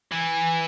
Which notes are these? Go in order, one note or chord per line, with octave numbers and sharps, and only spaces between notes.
E3